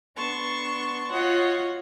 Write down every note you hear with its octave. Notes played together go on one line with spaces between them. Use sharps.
B3 D4 A5 C6 C#6
F4 F#4 C#5 D#5 F#5